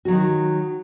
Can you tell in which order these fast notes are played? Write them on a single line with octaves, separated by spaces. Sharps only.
F#4 F#3 D#3